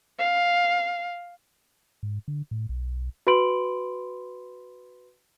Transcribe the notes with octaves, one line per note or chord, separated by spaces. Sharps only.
F5
G#2
D3
A2
B1
F#4 B4 B5 C6 D7 F#7